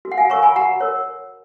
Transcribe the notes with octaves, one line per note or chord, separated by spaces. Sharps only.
F#4
F#5
F5 G#5
A#4 C#5 A#5 C#6
G#5 B5
F#4 F#5 A#5
A#4 C#5